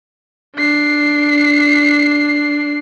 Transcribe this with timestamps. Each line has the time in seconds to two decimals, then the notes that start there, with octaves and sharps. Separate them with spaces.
0.56 D4 C7